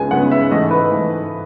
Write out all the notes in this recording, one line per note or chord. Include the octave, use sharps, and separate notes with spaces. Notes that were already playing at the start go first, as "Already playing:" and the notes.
Already playing: C#2 C#3 G#3 B3 G#5
C#2 C#3 G#3 B3 F#5
E5
G#2 E3 A3 D#5
B4
G#2 E3 A3